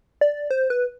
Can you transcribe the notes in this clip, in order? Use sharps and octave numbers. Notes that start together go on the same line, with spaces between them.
D5
C5
B4